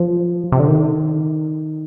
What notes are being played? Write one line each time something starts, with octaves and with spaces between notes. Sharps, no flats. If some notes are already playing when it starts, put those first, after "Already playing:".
Already playing: F3
C3
D3
D#3